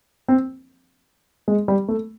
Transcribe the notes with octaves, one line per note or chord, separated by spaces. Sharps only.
C4
G#3
G3
A3